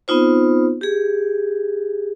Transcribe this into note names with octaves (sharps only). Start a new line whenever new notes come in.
B3 C4 D#4 F4 C5
G4 G#4